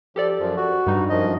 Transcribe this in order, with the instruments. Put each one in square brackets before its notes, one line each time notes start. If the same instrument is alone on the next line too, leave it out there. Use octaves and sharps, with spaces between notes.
[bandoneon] F3 [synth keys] G4 A4 D5
[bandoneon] F#2 F3
F#4
[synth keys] G2 G3 D#4
[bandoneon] F#2 F3 D#5